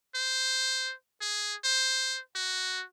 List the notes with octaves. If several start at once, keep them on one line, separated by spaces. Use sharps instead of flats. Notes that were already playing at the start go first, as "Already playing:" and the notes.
C5
G#4
C5
F#4